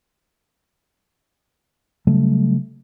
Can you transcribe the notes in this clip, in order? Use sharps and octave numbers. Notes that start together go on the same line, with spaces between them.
C#3 F#3 G3 A3